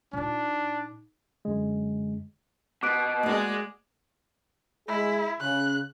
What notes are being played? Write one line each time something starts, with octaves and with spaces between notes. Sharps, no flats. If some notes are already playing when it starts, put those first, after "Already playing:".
A#2 D4 D#4
F#2 D3 G#3
B2 D6 F#6 D7
G#3 A#3 F#4 D5
G#3 E4 G#4
C#3 F#6